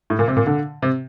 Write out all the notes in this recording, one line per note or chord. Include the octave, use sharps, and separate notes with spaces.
A2
A#2
C3
A#2
D3
C3